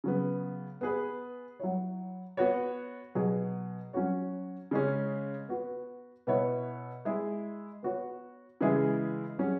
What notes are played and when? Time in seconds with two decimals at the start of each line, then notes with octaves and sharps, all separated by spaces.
0.04 C#3 F#3 B3
0.81 B3 G#4 B4
1.60 F#3 E4 C#5
2.37 B3 F#4 C#5
3.15 B2 F#3 B3 G#4
3.93 F#3 C#4 F#4 C#5
4.71 C#3 G#3 C#4
5.49 B3 F#4 B4
6.27 B2 B3 E4 C#5
7.05 G#3 E4 G#4
7.83 B3 F#4 C#5
8.61 C#3 E3 G#3 E4 G#4
9.38 F#3 C#4 G#4 C#5